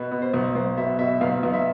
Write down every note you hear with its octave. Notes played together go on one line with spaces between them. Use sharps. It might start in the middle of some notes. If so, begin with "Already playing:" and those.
Already playing: B2 B4
B2
C5
B1
B1 C5
B2 E5
B2 E5
B1 F5
B1
E5